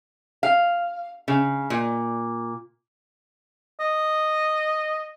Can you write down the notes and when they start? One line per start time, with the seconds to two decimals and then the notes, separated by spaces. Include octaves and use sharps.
0.43 F5
1.28 C#3
1.70 A#2
3.80 D#5